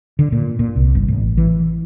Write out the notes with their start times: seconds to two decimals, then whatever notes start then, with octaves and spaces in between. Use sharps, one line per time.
0.19 D3
0.32 A#2
0.59 A#2
0.76 C2
0.95 G1
1.08 A1
1.38 E3